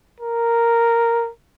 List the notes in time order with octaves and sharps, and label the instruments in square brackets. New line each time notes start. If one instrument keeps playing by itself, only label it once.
[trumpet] A#4